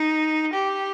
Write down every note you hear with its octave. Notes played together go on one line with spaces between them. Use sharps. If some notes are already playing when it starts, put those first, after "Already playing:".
Already playing: D#4
G4